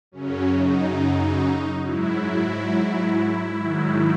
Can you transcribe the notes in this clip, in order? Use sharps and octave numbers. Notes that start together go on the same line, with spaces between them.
F#2 C#3 F#3 C#4
D#4
G#2 F#3 E4
G#2 D#3 F#3